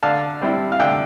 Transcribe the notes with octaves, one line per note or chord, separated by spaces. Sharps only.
D3 F5 A5
G3 C4 E4
F5
D3 E5 G5